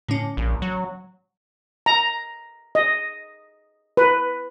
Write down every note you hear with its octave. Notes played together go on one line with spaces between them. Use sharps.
A2 D3 C#4
A#1
F#3
A#5
D#5
B4